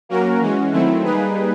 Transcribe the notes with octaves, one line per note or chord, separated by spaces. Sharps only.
F#3 A#3 C#4 F#4 A#4
E3 G#3 C#4 F#4
D#3 F#3 A3 C4 E4
G3 A#3 D#4 G#4 B4